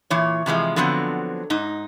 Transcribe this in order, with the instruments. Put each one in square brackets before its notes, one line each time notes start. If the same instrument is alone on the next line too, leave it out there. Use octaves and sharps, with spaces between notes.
[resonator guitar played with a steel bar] A#2 E3 C#5
C3 E3 F3 G#3
D3 F3 F#3 B3 C4
G#2 D#4